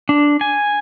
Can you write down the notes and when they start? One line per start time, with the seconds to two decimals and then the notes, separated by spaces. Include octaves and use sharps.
0.09 D4
0.41 G#5